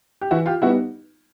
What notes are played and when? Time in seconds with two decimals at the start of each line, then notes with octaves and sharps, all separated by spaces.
0.21 G4
0.31 E3 E4 F#4
0.46 F4 G4
0.62 G3 B3 D#4 E4 F#4